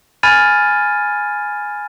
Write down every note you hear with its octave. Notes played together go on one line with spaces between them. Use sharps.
G#5 B5 F6 G#6 A6 D#7